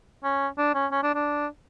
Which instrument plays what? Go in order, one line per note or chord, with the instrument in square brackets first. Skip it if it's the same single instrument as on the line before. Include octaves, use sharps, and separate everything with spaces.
[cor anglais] C#4
D4
C#4
C#4
D4
D4